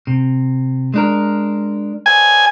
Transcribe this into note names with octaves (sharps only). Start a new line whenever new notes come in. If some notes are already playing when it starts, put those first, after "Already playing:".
C3
G#3 D4 A#4
G#5